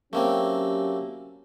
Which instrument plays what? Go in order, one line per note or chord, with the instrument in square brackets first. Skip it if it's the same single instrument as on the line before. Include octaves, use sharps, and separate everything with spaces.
[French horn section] F#3 C#4 G4 [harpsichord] A3 A#3 C4